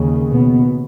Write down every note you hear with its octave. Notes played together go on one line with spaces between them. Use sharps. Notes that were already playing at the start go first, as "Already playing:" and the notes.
Already playing: D#2 C#3
B2 B3